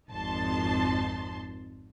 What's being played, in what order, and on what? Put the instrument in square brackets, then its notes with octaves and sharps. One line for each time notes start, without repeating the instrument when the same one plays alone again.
[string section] G#1 F2 D#4 A5 C6